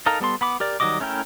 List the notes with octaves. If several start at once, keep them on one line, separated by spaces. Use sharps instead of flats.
D#4 A4 A#4 F5
G3 B3 A4 C6
B3 B5 D6
G4 A#4 D5
D#3 F#3 G3 D#5 D6
A3 C#4 E4 A#4 G5